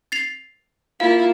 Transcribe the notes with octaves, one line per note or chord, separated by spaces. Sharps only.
A6 C7 F7
A#3 E4 F4 F5